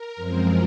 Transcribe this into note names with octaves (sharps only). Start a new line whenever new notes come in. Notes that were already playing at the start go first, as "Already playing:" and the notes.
Already playing: A#4
F#2 F3 G#3 C4